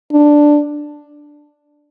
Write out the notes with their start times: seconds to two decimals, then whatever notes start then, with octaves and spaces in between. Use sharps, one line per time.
0.12 D4